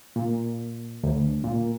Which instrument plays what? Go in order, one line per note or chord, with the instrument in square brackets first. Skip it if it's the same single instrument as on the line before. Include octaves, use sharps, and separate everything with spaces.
[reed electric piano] A#2
D2
A#2